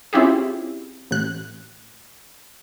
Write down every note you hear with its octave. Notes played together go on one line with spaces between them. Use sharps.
C4 C#4 E4 F4 G4 G#4
A1 F#6